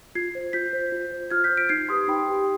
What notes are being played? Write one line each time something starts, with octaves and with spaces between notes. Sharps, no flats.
F4 G#6 C7
C5
F4 G6 B6
C5
F4
C5
F4 F6 G#6
G6 B6
C5
B6 D7
D#4 G#6 C7
G4 B4 C6 D#6
D#4 G5 B5
G4 B4